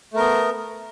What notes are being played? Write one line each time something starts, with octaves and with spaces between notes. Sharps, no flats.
A3 B3 A#4